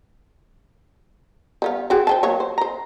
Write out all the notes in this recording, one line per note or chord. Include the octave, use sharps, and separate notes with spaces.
G3 B3 F5
C4 F#4 G#4
C5 G5 A5
F#3 A#3 C#5
C5
C5 A#5